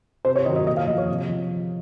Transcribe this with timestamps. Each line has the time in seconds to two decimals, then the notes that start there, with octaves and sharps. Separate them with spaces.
0.25 C3 C5
0.36 C#5
0.45 D#3 F#3 D#5
0.56 D#5
0.67 A#2 D#5
0.77 F5
0.87 F3 D#5
0.98 C#5
1.09 C3
1.29 F3